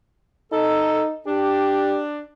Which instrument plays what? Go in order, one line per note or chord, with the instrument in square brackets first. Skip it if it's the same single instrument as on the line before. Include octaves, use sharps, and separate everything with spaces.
[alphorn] D#4 [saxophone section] A4
[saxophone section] D4 [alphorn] G4